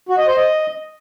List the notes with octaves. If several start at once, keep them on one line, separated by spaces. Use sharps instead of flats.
F#4
D#5
C5
D#5